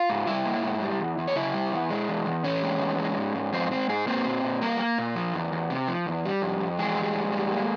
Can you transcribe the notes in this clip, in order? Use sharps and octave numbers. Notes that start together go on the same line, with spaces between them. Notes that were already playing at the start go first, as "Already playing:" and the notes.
Already playing: F4 F5
G#2
G3 E4 E5
A#3
G#2
G3
E2
E2
C#5
C#3 E4 E5
G3
E2
G#3
E2
E2
E3 C#4 C#5
G#3
E2
G#3
G#2
G#2
F3 C4 C5
G#3 C4 C5
G#2 G#3 G#4
A#3 C4 C5
A#2
A#2
G3 A#3 A#4
A#3
A#2
F3
E2
E2
C3
F3
E2
G3
F2
F2
E3 G#3 G#4
G3
F2
G3
A#3